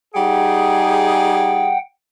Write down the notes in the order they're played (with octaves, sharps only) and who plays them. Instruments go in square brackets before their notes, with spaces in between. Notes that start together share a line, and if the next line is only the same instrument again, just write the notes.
[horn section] G3 D#4 G#4 [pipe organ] F#5 G5